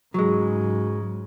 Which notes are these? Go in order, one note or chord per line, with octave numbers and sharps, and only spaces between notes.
G#2 C#3 F#3 G#3